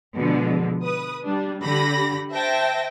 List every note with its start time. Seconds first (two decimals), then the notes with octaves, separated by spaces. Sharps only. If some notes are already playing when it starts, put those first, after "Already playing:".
0.17 B2 D3 F3 G#3
0.84 B4 D#6
1.24 G3 D4
1.62 D3 G4 B5 A#6
2.31 C5 E5 G5 A5 A#6